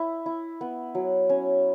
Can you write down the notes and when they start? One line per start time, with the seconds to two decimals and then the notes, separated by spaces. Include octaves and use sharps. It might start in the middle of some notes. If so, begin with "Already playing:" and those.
Already playing: E4
0.26 E4
0.61 B3
0.95 F#3
1.29 C#4